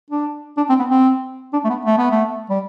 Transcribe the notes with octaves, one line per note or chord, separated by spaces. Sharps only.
D4
D4
C4
B3
C4
D4
A3
B3
A3
B3
A3
G3